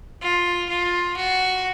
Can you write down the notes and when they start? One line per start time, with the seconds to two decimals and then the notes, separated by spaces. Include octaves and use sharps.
0.22 F4
0.69 F4
1.16 F#4